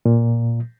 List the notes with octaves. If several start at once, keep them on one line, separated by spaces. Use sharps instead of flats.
A#2